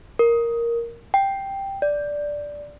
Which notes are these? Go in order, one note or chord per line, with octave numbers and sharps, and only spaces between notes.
A#4
G5
D5